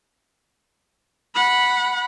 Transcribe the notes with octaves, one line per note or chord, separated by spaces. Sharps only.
F#5 B5